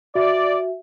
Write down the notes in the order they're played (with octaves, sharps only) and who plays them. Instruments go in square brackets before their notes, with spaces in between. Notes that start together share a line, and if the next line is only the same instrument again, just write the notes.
[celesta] F#4 E5 [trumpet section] D5